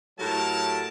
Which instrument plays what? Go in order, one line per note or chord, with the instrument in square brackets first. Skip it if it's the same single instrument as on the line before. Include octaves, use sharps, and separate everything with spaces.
[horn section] A2 F#3 A3 G4 A#4 A5